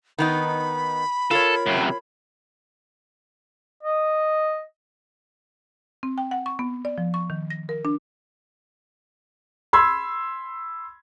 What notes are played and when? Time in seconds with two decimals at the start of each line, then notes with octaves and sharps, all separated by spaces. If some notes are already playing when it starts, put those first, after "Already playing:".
0.18 D#3 B3 D#4 B5
1.31 F4 A4 A#4 C#5
1.66 F#2 C3
3.83 D#5
6.03 C4
6.18 G5
6.31 F#5
6.46 C#6
6.59 B3
6.85 D5
6.98 F3
7.14 C#6
7.30 D#3
7.50 A#6
7.69 A#4
7.85 D4
9.73 B5 C6 E6 G#6